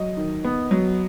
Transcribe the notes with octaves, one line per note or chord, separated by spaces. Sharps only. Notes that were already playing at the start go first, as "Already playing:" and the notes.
Already playing: F#3 D#5
D#3
B3
F#3